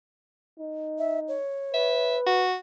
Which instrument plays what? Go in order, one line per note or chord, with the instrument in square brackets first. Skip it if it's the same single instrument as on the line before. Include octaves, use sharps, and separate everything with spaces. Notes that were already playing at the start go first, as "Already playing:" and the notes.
[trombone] D#4
[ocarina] E5
C#5
[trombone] B4 [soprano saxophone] E5
[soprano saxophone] F#4